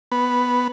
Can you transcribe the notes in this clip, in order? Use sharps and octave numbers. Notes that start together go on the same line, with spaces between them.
B3